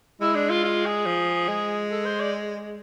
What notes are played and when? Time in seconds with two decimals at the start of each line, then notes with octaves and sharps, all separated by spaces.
0.21 G#3 E4
0.35 D4
0.49 F4
0.64 F4
0.85 G#4
1.06 F3
1.48 G#3
1.91 A4
2.05 C5
2.20 D5